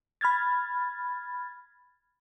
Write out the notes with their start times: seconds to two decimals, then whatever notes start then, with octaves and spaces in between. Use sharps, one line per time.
0.21 B5 F6 G#6 A6